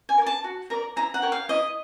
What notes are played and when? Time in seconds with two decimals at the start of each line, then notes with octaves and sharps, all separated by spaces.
0.09 G#5
0.18 A#4 D5
0.26 A5
0.44 F#4
0.70 A#4 D5 A#5
0.96 E4 A#5
1.14 F#5
1.22 G4 A#4 C#5
1.32 F5
1.49 E4 D#5